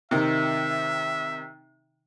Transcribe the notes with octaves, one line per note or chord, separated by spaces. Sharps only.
C3 D#3 E5